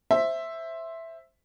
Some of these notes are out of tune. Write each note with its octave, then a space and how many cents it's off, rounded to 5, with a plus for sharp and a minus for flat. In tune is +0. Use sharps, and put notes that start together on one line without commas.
C5 +10 E5 +0